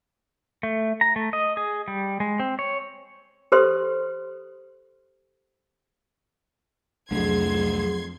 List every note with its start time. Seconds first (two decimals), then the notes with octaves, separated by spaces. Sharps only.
0.63 A3
1.01 A#5
1.16 A3
1.33 D#5
1.57 G#4
1.88 G3
2.20 G#3
2.40 C4
2.59 C#5
3.52 G4 A4 B4 C5 C6
7.11 C2 F2 F#3 A3 D4 G#4 C6 G#6